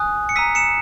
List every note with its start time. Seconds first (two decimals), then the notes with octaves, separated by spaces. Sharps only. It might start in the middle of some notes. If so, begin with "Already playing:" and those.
Already playing: G#5 D#6 F#6
0.29 C#7
0.36 A#5 E6 B6 D#7
0.55 C#7 E7